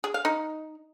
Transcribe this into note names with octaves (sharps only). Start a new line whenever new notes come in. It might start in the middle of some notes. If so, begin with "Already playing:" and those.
G#4
F5
D#4